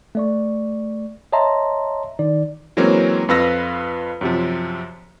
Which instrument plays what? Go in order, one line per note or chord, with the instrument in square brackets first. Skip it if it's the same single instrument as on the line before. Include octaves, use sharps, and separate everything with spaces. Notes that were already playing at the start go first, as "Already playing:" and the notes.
[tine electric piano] A3 D5 C#6
C#5 D#5 E5 A5 A#5 C6
D#3 D#4 D5
[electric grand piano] E3 F#3 G#3 A#3 C4 C#4
F2 F4 B4 F5 E6 A#6
F#2 C3 F3